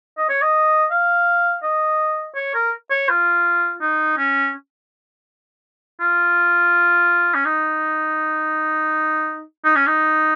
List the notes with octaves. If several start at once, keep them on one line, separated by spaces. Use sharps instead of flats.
D#5
C#5
D#5
F5
D#5
C#5
A#4
C#5
F4
D#4
C#4
F4
C#4
D#4
D#4
C#4
D#4